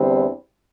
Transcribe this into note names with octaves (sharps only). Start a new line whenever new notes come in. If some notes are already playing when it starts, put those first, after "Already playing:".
Already playing: E2 D3 G3 C4